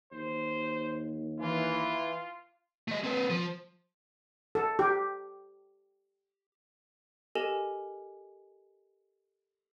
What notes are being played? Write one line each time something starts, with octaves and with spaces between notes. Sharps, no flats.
D#2 C5
E3 F4
A3 D#5
C4 B4
F3
A4
G4
G4 A4 A#4 D#5 G#5 E7